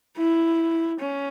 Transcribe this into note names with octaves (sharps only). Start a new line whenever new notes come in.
E4
C#4